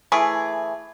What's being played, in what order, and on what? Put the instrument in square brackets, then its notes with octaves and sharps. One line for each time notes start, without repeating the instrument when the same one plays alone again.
[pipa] E3 A3 G#4